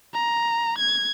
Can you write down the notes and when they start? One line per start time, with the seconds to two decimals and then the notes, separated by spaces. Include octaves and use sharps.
0.14 A#5
0.78 G#6